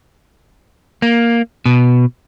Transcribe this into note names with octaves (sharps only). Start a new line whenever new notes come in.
A#3
B2